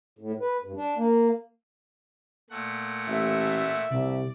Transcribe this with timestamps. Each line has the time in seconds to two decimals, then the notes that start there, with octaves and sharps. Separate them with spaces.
0.19 A2
0.41 B4
0.63 G2
0.76 D4
0.97 A#3
2.50 A#2 A3 F#5
3.07 A1 E5
3.90 C2 C3 D5